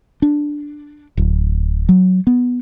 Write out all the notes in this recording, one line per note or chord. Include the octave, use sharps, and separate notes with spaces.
D4
D1
F#3
B3